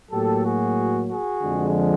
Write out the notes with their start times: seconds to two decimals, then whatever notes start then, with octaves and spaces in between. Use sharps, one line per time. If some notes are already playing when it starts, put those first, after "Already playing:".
0.11 A2 F#3 A#3 G4 A4
0.44 F#4 G#4
1.10 F#4 G#4
1.43 F2 D3 F3 G#3